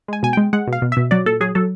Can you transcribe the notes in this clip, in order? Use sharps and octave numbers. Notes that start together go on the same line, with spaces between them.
G#3 G#5
B2 G#5
G#3 G5
G#3 F#5
B2
F5
B2
B2 E5
F#3 D5
A#2 A4
F#3 G#4
F#3 A4